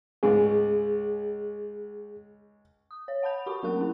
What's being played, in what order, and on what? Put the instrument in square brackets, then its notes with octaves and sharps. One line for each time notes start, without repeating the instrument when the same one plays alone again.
[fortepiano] C#2 G#2 [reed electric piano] G#4
[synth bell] D#6
C#5
F#5 A5 B5 G6 F7
F#4 G4 F#5 B5 C#6
F#3 A3 A#3 A#4 C#6 F#6
C#4 E4